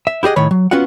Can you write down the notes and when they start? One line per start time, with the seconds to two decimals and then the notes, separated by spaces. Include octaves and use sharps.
0.07 E5
0.23 E4 G4 G#4 D#5 F#5
0.36 A2 D#3 C#5 B5
0.51 F#3
0.71 B3 C#4 F4 F#4 F#5